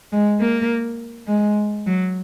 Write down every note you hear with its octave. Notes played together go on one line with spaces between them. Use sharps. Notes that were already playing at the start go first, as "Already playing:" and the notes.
G#3
A#3
G#3
F#3